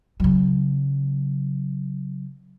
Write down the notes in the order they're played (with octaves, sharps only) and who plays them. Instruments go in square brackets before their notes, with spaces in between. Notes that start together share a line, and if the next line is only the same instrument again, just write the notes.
[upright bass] C#3 F#3